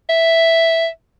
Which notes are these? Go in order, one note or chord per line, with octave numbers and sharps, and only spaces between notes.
E5